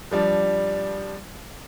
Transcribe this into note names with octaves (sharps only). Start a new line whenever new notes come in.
F3 G3 D4